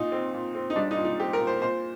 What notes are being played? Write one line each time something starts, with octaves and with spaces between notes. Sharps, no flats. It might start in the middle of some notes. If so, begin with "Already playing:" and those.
Already playing: A#2 D#4
C4
A#2
C4
D#4
G3 D4
D#4
A#2
D#4
C4 G4
A#4
A#2
C5
A#2 C5